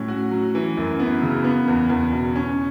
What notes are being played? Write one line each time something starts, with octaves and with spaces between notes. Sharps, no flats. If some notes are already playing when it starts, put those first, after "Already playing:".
Already playing: A2 F#3 C#4
F#4
F#3
E3
F#2
B3
C#3
B3
E2
E2
B2
C#4